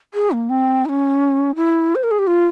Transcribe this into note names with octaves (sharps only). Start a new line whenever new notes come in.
G#4
A#3
C4
E4
C#4
E4
C5
A#4
G#4
G4
F4